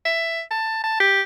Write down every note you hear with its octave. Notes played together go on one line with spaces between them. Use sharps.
E5
A5
A5
G4